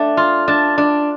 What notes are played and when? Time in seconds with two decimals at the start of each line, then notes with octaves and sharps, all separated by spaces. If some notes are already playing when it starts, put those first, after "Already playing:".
Already playing: A3 D4 G5
0.17 F4
0.48 D4 A5
0.78 D4